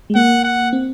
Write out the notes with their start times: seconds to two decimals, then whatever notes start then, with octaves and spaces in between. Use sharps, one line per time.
0.10 G#3
0.15 A#3 F#5
0.44 F#5
0.73 C4